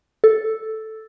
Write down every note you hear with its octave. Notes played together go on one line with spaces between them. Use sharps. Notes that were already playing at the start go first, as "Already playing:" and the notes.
A4